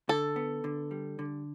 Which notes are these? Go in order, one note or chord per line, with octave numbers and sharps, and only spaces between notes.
D3 A4
B3
D3
G3
D3